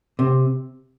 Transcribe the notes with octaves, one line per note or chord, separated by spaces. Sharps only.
C3